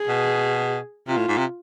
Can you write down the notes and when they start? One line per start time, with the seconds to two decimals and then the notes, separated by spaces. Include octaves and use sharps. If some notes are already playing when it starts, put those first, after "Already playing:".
Already playing: G#4
0.09 B2
1.08 C3 F4
1.17 A2
1.28 G#2
1.38 C3